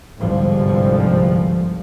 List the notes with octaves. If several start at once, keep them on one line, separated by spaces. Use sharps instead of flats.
G1 C2 G#2 D3 F3